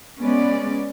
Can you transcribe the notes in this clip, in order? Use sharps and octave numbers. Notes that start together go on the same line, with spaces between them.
G#3 B3 C#4 D5